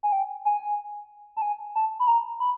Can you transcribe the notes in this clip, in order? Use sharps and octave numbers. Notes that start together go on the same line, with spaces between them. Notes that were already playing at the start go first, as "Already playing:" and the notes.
G#5
G5
G#5
A5
G#5
A5
B5
A#5
B5